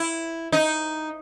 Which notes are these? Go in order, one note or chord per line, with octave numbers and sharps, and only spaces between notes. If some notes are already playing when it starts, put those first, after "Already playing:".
Already playing: E4
D#4